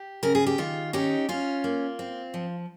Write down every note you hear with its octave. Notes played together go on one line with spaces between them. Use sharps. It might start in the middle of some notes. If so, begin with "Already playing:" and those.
Already playing: G4
C#3 A#4
G#4
G4
D#3 F4
C#4 D#4 G4
C#4 F4
A#3
C4
F3